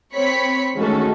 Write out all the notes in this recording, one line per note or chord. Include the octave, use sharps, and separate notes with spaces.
C4 C#5 B5 B6 C#7
D#3 G#3 A3 C#4 F#4 A4